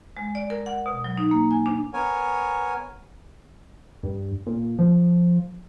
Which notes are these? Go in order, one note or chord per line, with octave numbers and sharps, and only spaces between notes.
G#3
D5
A#4
F#5
B2
F#3
D#4
A#3
G#5
D4
B3 A#4 C#5 G#5
G2
A#2
F3